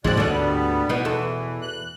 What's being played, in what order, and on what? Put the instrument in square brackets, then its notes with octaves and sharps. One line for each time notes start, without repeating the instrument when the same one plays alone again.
[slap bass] A1 E2 G#2 [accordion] B2 D5 F#6 [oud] G#3 C4
[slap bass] D2 G#2 D3 [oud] A3 D4
[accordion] G3 B3
[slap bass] B2 [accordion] E3 [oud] B3 D#4
[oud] E2 A4
[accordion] F#6